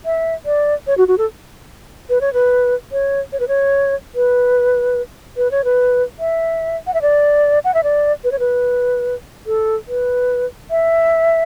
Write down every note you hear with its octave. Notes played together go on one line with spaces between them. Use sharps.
E5
D5
C#5
F#4
F#4
A4
B4
C#5
B4
C#5
C#5
B4
C#5
B4
B4
C#5
B4
E5
F#5
E5
D5
F#5
E5
D5
B4
C#5
B4
A4
B4
E5